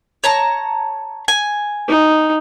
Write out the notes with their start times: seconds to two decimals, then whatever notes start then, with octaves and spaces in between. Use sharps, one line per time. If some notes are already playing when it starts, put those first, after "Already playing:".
0.24 C#5 A5 A#5
1.28 G#5
1.89 D#4